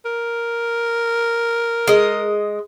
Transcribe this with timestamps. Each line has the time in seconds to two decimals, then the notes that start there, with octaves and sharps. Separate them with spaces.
0.05 A#4
1.87 G#3 D#5